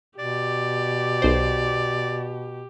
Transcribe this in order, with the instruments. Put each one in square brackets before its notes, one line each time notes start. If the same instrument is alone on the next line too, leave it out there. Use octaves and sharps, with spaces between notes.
[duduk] B2 [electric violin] G4 [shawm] D5
[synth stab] B1 C5